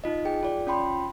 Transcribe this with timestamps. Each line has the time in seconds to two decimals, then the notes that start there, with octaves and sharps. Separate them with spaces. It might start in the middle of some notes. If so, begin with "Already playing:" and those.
0.04 D#4 F4 D#5
0.25 G#4 G5
0.43 F4 D5
0.67 C#4 F4 G5 B5 C6